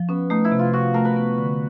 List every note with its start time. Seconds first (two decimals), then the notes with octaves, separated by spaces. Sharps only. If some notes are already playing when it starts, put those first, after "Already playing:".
Already playing: F3
0.09 B3 C#4
0.30 A3 D#4
0.45 E4
0.52 C3
0.59 F4
0.73 C3 F#4
0.94 A3 A#4
1.05 B4
1.16 B3
1.38 D3